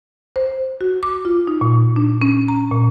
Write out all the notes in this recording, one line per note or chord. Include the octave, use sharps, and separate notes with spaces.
C5
F#4
D6
F4
D#4
A#2
D4
C#4
A#5
A#2